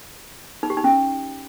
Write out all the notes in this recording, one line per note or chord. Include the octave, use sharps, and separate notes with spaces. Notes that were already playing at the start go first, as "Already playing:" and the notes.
D#4
G4
D#4
C#4